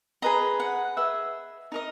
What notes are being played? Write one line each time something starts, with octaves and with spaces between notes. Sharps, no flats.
G#4 B4 D#5 A#5
F#5
G#4 B4 D#5 E5
D#4 A#4 D#5